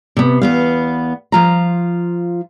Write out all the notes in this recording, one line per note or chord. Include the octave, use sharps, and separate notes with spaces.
C3 B3
E2 B3 F5
F3 F4 A#5